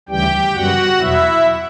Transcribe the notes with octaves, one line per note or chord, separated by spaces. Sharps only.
D2 C#3 E3 G3 G4 G5
F#2 C#3 G3 B3 F#4 F#5
E2 B2 F#3 B3 E4 E5